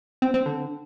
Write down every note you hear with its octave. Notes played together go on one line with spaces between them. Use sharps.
C4
C4
D3